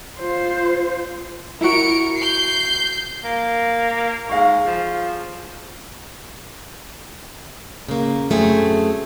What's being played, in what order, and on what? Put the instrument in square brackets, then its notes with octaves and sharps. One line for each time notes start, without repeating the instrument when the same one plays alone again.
[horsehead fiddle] F4 C5
[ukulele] E4 F#4 [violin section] A#4 C#7 D7
[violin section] G6 C7
[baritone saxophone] A#3
[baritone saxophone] G#2 [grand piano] G#4 F5 C#6
[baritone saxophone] F3
[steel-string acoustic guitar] C#3 A#3
F#2 A3 C4 G#4